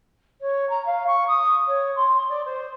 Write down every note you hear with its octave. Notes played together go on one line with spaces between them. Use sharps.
C#5
A#5
F5
C#6
D#6
C#5
C6
D5
C5